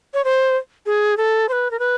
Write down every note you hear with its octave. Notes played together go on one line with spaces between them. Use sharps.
C#5
C5
G#4
A4
C5
B4
A#4
B4